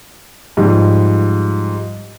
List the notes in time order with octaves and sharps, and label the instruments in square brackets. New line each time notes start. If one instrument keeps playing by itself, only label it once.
[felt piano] G#2 F3 G3